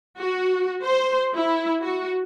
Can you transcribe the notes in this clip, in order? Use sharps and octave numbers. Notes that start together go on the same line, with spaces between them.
F#4
C5
E4
F#4